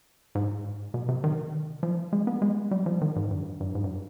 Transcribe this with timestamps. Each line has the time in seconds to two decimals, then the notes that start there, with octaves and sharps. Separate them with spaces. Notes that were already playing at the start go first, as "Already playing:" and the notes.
0.35 G#2
0.94 B2
1.09 C3
1.24 D#3
1.83 F3
2.13 G#3
2.27 B3
2.42 G#3
2.71 G3
2.86 F3
3.01 D#3
3.16 G#2
3.31 G2
3.60 G2
3.75 G#2
3.84 G2